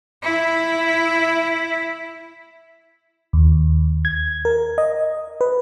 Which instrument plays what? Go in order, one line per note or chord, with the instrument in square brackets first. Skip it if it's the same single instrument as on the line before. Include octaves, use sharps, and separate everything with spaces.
[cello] E4 E5
[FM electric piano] D#2
G#6
A#4
D#5
B4